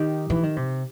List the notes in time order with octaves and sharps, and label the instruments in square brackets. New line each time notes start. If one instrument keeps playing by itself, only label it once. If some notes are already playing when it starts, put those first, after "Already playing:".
Already playing: [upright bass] D#3 [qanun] D#4 G4
[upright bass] E3
D#3
C3